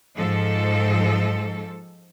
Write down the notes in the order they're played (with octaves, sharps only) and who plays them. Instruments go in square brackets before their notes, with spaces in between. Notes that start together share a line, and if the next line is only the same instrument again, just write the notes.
[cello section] G#2 F3 A4